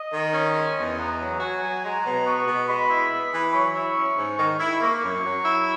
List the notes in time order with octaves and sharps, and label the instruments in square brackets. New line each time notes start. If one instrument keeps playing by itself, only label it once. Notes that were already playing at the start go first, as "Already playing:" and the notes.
Already playing: [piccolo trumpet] D#5
[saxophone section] D#3
C#4
G#3
E2
[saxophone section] B3 [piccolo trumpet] A#5
[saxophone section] F#3
[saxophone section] F#4 [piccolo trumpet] G#5
[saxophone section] F#3
[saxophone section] G#3 [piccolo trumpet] A#5
[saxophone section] B2
[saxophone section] B3 [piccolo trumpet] C#6
[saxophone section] B2
[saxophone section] G#3 [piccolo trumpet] B5
[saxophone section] E4
B3
E3
[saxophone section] F#3 [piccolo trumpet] C#6
[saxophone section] E4
C#4
G#2
[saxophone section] D#3 [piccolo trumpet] C#6
[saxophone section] E4
[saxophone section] A#3 [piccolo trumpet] C#6
[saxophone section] F#2
F#3
E4